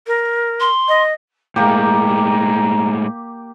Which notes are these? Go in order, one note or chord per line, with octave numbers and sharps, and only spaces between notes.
A#4
C6
D#5
A2 G#3 A#3 G4 A#5